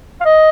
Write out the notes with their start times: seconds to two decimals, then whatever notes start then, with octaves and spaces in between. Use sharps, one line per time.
0.21 F5
0.25 D#5